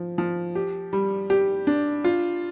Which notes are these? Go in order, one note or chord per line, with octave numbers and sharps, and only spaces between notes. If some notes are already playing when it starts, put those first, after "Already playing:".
Already playing: F3
F3
G4
G3
G4
D4
F4